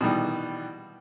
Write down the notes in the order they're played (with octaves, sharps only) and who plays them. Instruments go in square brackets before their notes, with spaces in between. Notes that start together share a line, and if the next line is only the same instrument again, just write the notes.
[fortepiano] B2 D#3 E3 G3